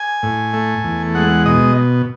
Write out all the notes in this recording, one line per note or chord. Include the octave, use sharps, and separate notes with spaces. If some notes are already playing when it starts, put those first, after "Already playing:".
Already playing: G#5
A2
A3
E2
G#3 F#5
B2 D#5